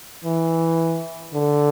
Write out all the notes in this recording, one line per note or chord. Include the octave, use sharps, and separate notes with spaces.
E3
D3